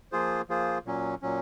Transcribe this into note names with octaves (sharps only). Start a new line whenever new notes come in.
F3 A#3 F4 G#4 C5
F3 A#3 F4 G#4 C5
A#2 F#3 C#4
A#2 F#3 C#4